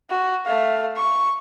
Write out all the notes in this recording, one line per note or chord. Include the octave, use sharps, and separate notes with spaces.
F#4
A3 F5
C#6